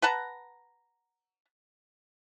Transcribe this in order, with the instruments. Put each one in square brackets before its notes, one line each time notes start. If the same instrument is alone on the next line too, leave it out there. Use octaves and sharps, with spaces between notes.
[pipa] B4 F#5 A5 A#5